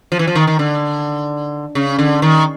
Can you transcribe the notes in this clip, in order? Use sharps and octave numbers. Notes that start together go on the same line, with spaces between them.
F3
E3
F3
D#3
D#3
D3
C#3
D3
D#3